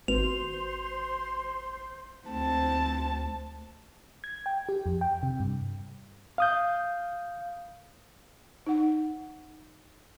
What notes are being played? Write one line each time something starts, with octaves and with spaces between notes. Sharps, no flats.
G#1 F#4 B4 C5 C6 F7
D2 C4 A5
G#6
G5
G4
F2
G5
C3
G2
F5 D#6 G6
D#4 F#5